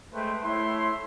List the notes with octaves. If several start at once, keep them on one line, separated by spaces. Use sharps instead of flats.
G#3 A3 B4 C5 G5
A3 E4 C#5 E5 C6